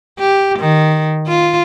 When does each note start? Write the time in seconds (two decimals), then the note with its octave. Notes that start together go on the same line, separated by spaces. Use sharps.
0.19 G4
0.60 D#3
1.28 F4